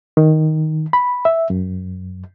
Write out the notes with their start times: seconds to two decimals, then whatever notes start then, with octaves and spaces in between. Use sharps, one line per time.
0.17 D#3
0.93 B5
1.25 E5
1.50 F#2